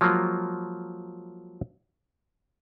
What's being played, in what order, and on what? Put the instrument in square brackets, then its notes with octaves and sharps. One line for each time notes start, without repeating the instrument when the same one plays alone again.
[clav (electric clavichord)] F3 F#3 G#3 A#3 F4